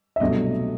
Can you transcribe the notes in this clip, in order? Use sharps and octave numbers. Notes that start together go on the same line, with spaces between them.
E5
C2 B2 F#3 A3 D4 D#5